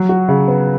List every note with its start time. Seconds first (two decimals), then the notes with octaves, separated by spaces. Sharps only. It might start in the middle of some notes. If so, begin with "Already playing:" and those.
Already playing: F#3
0.09 F#4
0.28 C#3
0.48 B3